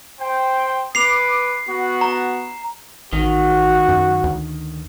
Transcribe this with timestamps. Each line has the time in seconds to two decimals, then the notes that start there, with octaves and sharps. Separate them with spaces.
0.20 C5 G5
0.95 B4 D6 C7 F7
1.68 B3 F#4
2.01 A#5
3.13 A1 D#3 F#4
3.89 F#2
4.24 D2